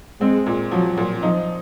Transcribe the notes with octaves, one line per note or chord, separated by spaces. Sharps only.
G#3 C4
A#2
F3 F#3
A#2
F3 D#4